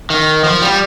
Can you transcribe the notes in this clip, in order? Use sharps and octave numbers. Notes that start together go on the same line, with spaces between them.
D#3
F3
G3